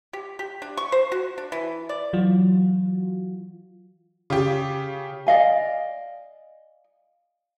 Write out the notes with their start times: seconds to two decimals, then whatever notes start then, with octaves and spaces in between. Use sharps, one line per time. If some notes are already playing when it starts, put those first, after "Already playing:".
0.13 G4
0.39 G4
0.62 D4
0.77 C#6
0.92 C5
1.12 F#4
1.38 D4
1.52 E3
1.89 D5
2.13 E3 F#3 F4 F#4
4.30 C#3 F4 G4
5.27 D5 D#5 F5 G#5